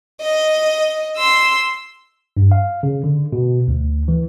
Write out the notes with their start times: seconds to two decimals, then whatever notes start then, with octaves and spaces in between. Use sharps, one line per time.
0.21 D#5
1.17 C6 E6
2.37 G2
2.52 F5
2.83 C#3
3.04 D3
3.33 B2
3.68 D2
4.08 E3